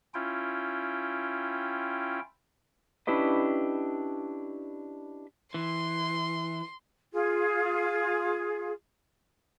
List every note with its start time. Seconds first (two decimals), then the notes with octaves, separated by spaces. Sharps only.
0.14 C#4 E4 F4 G5
3.07 C#4 D4 E4 G4 B4 D#5
5.54 E3 C6
7.13 F4 G#4